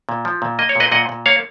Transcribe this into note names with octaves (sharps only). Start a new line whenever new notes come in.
A#2
F3
A#2
A#3 D#5
C#5
A#2 B4 D#5
A#2 D#5 F#5
A#2
A#3 C#5 F5